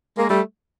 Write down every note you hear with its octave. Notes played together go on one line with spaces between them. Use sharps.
G#3 A#3
G3 A3